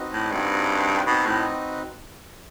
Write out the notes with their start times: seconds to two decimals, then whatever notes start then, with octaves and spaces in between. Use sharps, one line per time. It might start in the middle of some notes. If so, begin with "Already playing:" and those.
Already playing: C4 D#4 F#4 B4 D#5
0.13 A2
0.31 G2 C4 D#4 F#4 B4 D#5
1.07 B2 C4 D#4 F#4 B4 D#5
1.26 A2